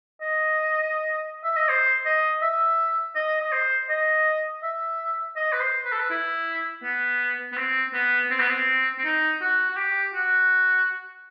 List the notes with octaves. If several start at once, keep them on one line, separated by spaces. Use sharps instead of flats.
D#5
E5
D#5
C5
D#5
E5
D#5
D#5
C5
D#5
E5
D#5
B4
C5
B4
A4
B4
E4
B3
B3
C4
B3
C4
B3
C4
C4
D#4
F#4
F#4
G4
F#4